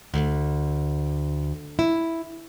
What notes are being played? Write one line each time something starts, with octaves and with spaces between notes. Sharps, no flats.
D2
E4